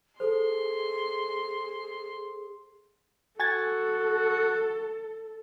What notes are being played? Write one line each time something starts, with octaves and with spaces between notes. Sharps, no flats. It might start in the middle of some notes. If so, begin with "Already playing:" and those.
G#4 A4 C5 C6
F#4 A4 G#5 G#6 A6